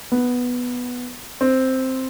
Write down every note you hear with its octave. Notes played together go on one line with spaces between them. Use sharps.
B3
C4